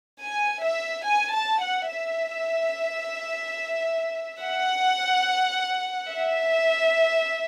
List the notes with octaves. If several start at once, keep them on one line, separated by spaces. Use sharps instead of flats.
G#5
E5
G#5
A5
F#5
E5
F#5
E5